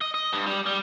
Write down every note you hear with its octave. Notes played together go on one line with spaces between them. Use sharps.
D#5
D#5
G2
G3
G3